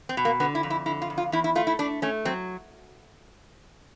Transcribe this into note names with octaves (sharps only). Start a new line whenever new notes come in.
C4
B2
A#3
D3 B3
E4
F2
E4
D3 E4
F4
F2
F4
E2 E4
E4
A3 F4
E4
A3 D4
A3 C#4
F#3 C4